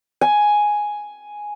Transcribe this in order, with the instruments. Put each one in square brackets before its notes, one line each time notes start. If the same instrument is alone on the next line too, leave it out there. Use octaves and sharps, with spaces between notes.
[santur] G#5